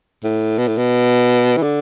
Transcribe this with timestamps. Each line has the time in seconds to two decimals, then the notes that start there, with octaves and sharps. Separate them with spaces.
0.24 A2
0.58 B2
0.68 A2
0.77 B2
1.57 E3
1.63 D3